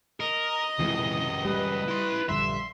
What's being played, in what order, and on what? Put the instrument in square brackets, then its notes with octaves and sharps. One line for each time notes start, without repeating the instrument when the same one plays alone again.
[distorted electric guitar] A#4 [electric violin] D#5
[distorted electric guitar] C#2 F#2 [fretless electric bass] C3 E3 G#3
[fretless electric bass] G3 [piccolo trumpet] B4
[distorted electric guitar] E4 C6
[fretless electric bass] A#1 G2 D3 [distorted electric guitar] E5 [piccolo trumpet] C6